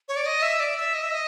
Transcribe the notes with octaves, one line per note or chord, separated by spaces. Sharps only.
C#5
D5
D#5
E5
D5
E5
D#5
E5
D#5